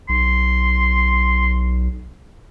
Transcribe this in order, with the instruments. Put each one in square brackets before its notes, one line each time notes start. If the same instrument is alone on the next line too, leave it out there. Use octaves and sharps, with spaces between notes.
[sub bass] B1 [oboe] C6